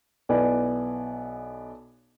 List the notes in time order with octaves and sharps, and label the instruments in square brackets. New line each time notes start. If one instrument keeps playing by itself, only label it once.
[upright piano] B1 B3 E4 D5 G#5